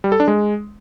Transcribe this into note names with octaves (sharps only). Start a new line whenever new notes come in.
G3
A4
D4
G#3